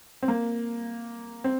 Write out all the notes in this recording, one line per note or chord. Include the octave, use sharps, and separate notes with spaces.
C4
A#3
C4